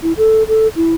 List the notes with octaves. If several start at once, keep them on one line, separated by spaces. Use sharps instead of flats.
E4
A4
A4
E4